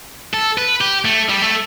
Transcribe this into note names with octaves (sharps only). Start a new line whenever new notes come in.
A4
B4
G4
A3
G3
A3